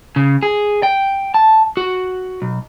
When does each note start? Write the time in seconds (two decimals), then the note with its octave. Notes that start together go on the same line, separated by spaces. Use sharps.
0.16 C#3
0.43 G#4
0.83 G5
1.34 A5
1.77 F#4
2.42 B1